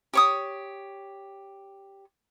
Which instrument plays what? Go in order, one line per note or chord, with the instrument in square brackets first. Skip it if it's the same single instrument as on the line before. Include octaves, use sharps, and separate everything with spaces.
[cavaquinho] G4 C#5 D#6